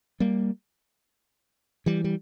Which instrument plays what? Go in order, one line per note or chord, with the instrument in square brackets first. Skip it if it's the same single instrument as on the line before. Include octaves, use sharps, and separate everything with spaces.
[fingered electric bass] G3 A#3
E3 G3
G3